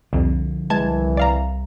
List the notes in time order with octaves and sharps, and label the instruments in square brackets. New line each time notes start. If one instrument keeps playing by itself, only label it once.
[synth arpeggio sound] C2 F2 [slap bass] D3 F3
[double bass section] C2 [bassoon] E3 [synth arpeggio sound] G#3 A5 G#6
[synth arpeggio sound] D5 F5 A#5